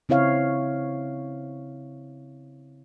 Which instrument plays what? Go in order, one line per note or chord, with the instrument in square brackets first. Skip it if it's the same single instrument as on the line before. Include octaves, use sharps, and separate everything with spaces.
[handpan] C#3 C4 E4 C#5 F5